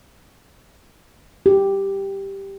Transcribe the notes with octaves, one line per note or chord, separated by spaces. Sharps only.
G4